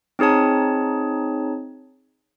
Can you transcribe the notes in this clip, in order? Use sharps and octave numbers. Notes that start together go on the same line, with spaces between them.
C4 D#4 G#4 C#5 A5